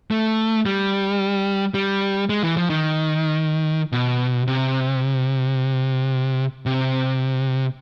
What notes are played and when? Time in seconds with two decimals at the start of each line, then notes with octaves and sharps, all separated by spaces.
0.11 A3
0.66 G3
1.74 G3
2.29 G#3
2.43 E3
2.57 F3
2.70 D#3
3.92 B2
4.47 C3
6.66 C3